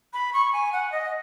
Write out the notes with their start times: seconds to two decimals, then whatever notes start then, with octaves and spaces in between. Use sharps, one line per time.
0.13 B5
0.33 C#6
0.53 G#5
0.73 F#5
0.92 D#5